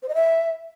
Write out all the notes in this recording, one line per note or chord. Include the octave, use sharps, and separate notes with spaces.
C5
D#5
E5